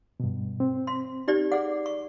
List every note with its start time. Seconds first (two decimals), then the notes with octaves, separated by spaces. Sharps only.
0.20 G2 B2
0.60 C4
0.87 C6
1.28 D#4 G4 D5
1.52 G#4 D5 F#5
1.86 C#6